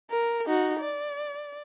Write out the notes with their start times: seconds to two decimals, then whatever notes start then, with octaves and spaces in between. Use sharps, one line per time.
0.10 A#4
0.46 D#4 F#4
0.80 D5